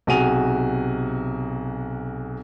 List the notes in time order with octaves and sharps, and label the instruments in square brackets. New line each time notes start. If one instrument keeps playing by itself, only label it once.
[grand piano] B1 C3 F#4 G#4 D#7 F7